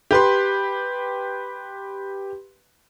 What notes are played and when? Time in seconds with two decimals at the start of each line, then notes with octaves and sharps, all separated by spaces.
0.11 G4 B4 C6